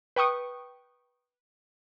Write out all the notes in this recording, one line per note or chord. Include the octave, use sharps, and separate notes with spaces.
B4 G5 C#6 D#6